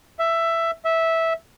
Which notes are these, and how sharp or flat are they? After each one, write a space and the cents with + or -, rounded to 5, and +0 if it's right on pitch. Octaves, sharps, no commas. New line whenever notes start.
E5 +10
E5 -10